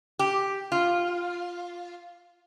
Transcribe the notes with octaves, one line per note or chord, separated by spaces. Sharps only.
G4
F4